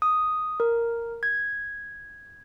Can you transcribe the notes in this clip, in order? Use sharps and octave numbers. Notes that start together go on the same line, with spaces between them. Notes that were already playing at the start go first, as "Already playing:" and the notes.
D#6
A#4
G#6